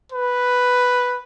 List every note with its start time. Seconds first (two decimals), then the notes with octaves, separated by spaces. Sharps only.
0.12 B4